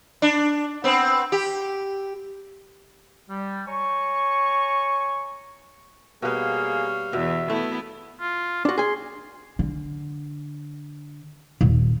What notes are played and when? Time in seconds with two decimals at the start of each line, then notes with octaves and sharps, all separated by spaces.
0.22 D4
0.84 B3 C4
1.32 G4
3.30 G3
3.67 C#5 G#5 A#5 C#6
6.22 B2 G3 A#3 G#4 B4 C#5 F5
7.13 E2 B2 E5
7.50 A3 B3 E4
8.21 F4
8.65 D4 F4 F#4
8.78 G#4 G#5 C6
9.59 D3
11.61 D#1